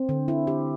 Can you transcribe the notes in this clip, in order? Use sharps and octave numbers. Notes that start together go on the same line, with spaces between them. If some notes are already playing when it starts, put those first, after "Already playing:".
Already playing: C4
D3
E4
G4